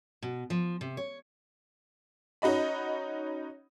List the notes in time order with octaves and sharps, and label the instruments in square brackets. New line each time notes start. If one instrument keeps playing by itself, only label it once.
[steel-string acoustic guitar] B2
F3
C3
C#5
[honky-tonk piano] C#4 D#4 F#4 D#5 B5